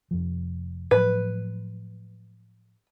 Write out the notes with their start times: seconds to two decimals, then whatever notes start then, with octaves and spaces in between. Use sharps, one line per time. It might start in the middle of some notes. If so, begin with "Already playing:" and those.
0.11 F1 F2 F3
0.91 A2 F3 F#3 B4